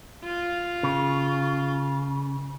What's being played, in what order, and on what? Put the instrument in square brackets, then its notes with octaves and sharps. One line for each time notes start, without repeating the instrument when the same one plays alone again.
[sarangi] F4
[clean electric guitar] C#3